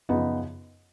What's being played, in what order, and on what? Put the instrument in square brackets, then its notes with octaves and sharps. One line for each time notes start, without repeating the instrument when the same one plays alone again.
[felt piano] F#2 C#3 F3 B3 D#4